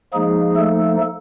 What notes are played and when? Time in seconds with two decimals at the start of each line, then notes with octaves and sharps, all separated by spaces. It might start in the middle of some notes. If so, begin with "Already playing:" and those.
0.13 F3 G#3 A#3 D#4 G#4
0.56 A3 A4